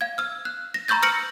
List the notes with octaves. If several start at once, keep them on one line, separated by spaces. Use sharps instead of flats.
F5 G#6
E6 F6
F#6
A#6
A#5 B5 C#6 E6 G6 A6
E6 F6 A#6 C#7 D7 F#7